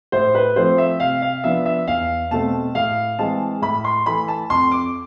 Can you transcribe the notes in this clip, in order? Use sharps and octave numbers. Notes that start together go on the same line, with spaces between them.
A2 C5
B4
F3 A3 C4 C5
E5
C3 F5
F5
F3 B3 D4 E5
E5
E2 F5
B2 A3 C4 A5
A2 F5
E3 G#3 C4 A5
A2 B5
C6
E3 A3 B5
A5
F2 C6
D6